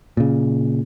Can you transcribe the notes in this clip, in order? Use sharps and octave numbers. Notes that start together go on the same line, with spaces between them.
A#2 C#3